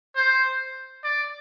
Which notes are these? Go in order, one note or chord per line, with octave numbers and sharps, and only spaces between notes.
C5
D5